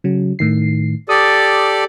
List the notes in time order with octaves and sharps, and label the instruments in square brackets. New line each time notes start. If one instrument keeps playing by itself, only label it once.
[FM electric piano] C#3 F#3
A2 D#3 C7
[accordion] G4 A4 D5 [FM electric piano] D#6